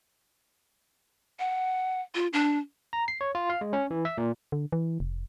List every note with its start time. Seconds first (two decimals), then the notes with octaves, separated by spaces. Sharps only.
1.39 F#5
2.15 F4
2.33 D4
2.93 A#5
3.08 C7
3.21 C#5
3.35 F4
3.50 F5
3.61 G#3
3.73 C#4
3.91 E3
4.05 E5
4.18 A#2
4.52 D3
4.72 E3
5.00 F1